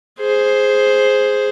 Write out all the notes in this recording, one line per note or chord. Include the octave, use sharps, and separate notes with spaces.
G#4 C5